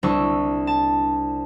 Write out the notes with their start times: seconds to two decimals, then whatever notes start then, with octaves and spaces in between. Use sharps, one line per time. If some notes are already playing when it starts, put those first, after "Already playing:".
0.03 C2 D4 C#6 E6
0.67 A5